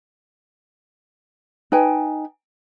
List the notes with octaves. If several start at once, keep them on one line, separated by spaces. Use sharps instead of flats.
D#4 B4 G5 G#5